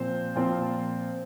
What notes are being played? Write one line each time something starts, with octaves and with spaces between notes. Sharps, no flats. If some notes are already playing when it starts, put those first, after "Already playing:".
Already playing: A#2 F3 C4 C5
A#2 F3 C4